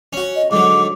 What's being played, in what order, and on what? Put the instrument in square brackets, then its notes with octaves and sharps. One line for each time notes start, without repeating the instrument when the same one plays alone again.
[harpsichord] C#4 F#4
[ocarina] D#5
[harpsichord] G#2 D3 F#3 [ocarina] D6